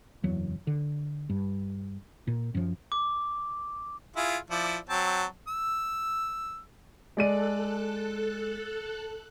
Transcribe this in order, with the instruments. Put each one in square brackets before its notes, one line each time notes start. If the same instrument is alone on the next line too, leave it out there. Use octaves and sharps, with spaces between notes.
[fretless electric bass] F#1 E2 F#3
D3
G2
A#2
F#2 F3
[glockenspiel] D6
[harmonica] E4 F4 G#4
F3 E4 D5
F#3 C4 A5
E6
[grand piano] G#3 D5 D#7 [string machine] A4 F#6